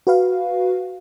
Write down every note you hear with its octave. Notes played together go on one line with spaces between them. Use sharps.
F#4 B4 F5